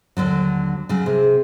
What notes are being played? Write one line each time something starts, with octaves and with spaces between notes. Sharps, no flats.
D#2 D3 F#3
C#3 F#3
C3 G#4